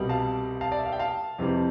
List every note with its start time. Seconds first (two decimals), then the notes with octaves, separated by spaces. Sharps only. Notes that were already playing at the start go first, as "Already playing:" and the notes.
Already playing: C2 B2 G3
0.09 F5 A5
0.61 F5 A5
0.72 D5
0.79 E5
0.86 F5
0.92 G5
0.99 F5 A5
1.38 F2 C3 E3 G3